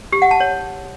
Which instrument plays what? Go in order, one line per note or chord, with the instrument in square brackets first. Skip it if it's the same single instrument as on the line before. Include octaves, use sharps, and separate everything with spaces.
[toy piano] G4
F#5
A5
C#5